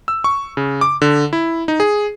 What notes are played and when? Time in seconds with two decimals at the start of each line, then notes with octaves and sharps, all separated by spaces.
0.08 E6
0.24 C#6
0.57 C#3
0.81 D6
1.02 D3
1.33 E4
1.68 D#4
1.80 G#4